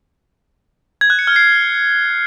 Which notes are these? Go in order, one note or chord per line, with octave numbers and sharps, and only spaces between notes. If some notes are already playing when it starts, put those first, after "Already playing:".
G#6
F#6
C#7
F6
C7